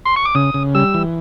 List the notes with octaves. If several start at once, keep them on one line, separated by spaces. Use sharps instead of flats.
C6
C#6
D6
C#3 D#6
C#3
G3 E6
E3